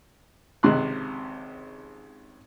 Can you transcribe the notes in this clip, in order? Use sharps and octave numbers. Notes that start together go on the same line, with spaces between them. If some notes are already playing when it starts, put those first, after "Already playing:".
G#1 C#2 C3 C6 F#6